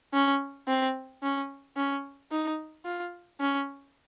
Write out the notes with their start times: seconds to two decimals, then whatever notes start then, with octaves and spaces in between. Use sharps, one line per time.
0.14 C#4
0.68 C4
1.23 C#4
1.77 C#4
2.31 D#4
2.85 F4
3.40 C#4